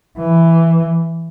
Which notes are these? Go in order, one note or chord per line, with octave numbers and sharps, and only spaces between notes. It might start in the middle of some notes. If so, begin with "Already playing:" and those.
E3